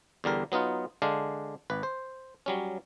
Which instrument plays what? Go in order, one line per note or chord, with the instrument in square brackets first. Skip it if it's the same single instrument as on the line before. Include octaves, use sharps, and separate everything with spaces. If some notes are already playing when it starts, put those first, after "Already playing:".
[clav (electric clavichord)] E2 D3 G3 A#4
F#3 B3 D#4 F4
D3 G#3 D4 F5
G#1 B4
C5
F#3 G3 C#4